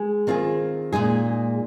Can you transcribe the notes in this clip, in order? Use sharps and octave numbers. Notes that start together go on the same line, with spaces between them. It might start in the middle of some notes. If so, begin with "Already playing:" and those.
Already playing: G#3 G#4
D#3 C4 F4 G#4
A#2 G#3 D#4 G#4